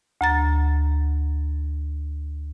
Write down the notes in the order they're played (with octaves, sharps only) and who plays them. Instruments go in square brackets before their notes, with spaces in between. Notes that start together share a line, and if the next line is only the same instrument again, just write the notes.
[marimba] D2 A#5 A6